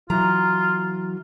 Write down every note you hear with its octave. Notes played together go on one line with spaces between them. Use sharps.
E3 F#3 F4 A#5